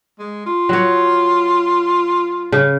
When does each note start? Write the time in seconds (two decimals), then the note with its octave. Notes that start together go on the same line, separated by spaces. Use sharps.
0.19 G#3
0.46 F4
0.69 F#3 C#5
2.52 C#3